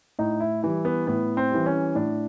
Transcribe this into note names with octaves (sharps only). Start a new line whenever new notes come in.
A2 D#4
E4
E3 G3 E4
B3
A2 B3
C4
E3 G3
C#4
A2 D4